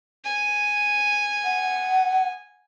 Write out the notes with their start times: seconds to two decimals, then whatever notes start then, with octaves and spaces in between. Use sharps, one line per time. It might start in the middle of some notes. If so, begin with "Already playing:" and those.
0.25 G#5
1.44 F#5